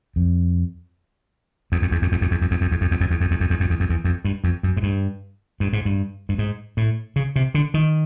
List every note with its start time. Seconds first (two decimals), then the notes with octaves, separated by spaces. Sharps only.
0.16 F2
1.72 E2
1.82 F2
1.91 E2
2.02 F2
2.12 E2
2.21 F2
2.31 E2
2.41 F2
2.51 E2
2.61 F2
2.71 E2
2.81 F2
2.91 E2
3.00 F2
3.11 E2
3.21 F2
3.31 E2
3.40 F2
3.50 E2
3.60 F2
3.70 E2
3.80 F2
3.89 E2
4.04 F2
4.25 G2
4.44 F2
4.63 F#2
4.77 G#2
4.83 G2
5.60 G2
5.73 G#2
5.85 G2
6.29 G2
6.38 G#2
6.77 A2
7.16 C#3
7.36 C3
7.54 D3
7.74 D#3